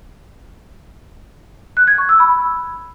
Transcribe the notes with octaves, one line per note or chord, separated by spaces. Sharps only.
F#6
G#6
C#6
E6
B5